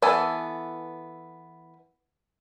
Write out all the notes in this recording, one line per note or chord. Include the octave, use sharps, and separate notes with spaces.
E3 B3 A4 G#5